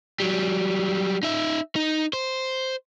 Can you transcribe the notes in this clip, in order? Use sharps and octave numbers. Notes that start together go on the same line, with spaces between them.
F#3 G3
D#4 E5
D#4
C5